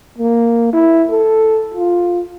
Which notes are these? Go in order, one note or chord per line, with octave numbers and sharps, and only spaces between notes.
A#3
E4
A4
F4